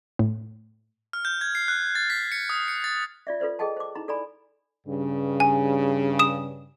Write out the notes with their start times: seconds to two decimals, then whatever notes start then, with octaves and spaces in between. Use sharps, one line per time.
0.19 A2
1.13 F6
1.25 G6
1.41 G#6
1.55 C7
1.68 F#6
1.95 A6
2.10 B6
2.32 C#7
2.50 D#6
2.68 C#7
2.84 A6
3.27 F4 D5 E5
3.40 F4 A4 B4 C5 D5
3.59 G#4 A4 D#5 G5 A5
3.77 C5 D6
3.95 D#4 E4 A#5
4.08 A4 D5 G#5 A#5 B5
4.87 G2 C#3
5.40 G#5
6.19 D#6 E7